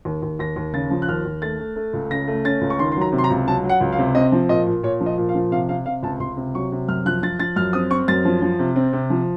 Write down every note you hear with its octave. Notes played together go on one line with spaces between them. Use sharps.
D#2
D#2
D#2 A#6
D#2
C#3 A6
F3
F#6
D#2 F6
D#2
A3 A6
A3
A3
C#2
C#3 A#6
A3
C#4 A6
C#2
C#6
D#3 C6
C6
F#3 A#5
C3
C6
A#5
C#2
F#3 A5
F#3
F#5
C#2
F5
C3
C4 D#5
F3
A#2 D#5
A#2
A#2 C#5
F3
D#5
A#2
F5
F3
C3 F5
C3 F5
C3 F5
C#2 A5
C#2 C6
C3
F#3 C#6
C3
F#2 F6
F3 F#6
F3 A6
F3 A6
F#2 F6
C4 D#6
C4 C#6
F#2 A6
F3
F3
C3
C4
C3
F3